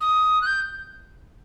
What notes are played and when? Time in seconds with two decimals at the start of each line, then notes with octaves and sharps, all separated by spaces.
0.01 D#6
0.42 F#6
0.46 G6